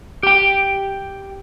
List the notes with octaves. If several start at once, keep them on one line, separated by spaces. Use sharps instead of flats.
G4 G5